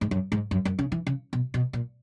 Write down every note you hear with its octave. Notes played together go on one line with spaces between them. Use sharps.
G#2
F#2
G#2
F#2
F#2
C#3
E3
C#3
B2
B2
A#2